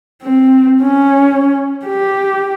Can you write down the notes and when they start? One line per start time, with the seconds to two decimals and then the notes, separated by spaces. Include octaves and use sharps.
0.23 C4
0.82 C#4
1.86 G4